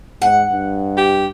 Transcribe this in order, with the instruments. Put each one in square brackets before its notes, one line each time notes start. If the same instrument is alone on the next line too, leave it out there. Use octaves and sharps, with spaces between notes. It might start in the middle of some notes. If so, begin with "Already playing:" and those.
[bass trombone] G#2 [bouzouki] F#5
[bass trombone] G2
[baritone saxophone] G4